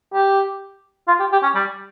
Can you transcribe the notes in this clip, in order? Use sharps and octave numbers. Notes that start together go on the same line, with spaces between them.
G4
F4
G4
G4
C#4
G3